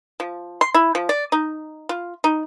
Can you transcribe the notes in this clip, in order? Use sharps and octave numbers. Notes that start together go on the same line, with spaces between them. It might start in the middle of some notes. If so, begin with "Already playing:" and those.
F3
C6
E4
F3
D5
D#4
F4
D#4